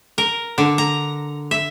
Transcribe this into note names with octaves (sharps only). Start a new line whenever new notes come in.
A#4
D3
A#5
E5